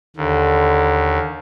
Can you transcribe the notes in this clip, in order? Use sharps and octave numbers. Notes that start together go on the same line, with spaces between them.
D#2 D3